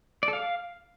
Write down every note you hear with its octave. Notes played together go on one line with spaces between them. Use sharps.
D5
A4
F5